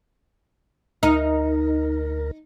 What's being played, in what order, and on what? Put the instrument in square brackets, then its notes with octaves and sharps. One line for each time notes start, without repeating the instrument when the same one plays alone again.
[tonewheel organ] D2 A#4 [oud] D#4